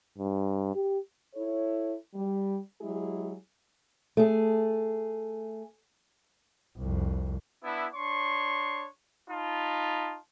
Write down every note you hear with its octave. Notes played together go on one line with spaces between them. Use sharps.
G2
G4
E4 A4 C#5
G3
F#3 G#3 E4 G4 G#4
A3 G#4
C2 F2
B3 D4 E4
D4 C#5 C6 C#6
D#4 F4 A5 B5